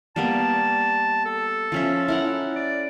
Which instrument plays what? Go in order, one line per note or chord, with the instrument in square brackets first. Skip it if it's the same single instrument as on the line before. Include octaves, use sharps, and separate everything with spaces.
[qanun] G3 A#3 B3 [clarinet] A5
[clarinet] A4
[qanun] F3 C#4 E5
E4 A#4 F#5
[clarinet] D5